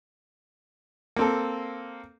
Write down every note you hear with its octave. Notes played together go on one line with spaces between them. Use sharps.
A#3 C4 A4